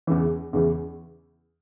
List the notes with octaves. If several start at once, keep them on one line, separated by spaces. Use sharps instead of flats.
E2 C#3 E3
E2 C#3 E3